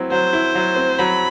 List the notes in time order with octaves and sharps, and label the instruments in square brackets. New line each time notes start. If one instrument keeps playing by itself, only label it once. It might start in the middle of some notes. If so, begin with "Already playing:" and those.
Already playing: [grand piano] F#3 C4 E4
[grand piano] F#3 [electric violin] C5
[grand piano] E4
F#3
C4
[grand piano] F#3 [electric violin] B5